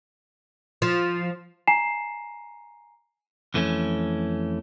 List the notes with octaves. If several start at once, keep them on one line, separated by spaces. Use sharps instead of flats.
F3
G#5 A#5 C7 E7
F2 E3 A3 C4 C#4